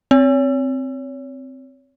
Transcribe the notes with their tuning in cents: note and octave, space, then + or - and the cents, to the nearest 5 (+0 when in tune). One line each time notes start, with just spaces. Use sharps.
C4 +0 C#5 +30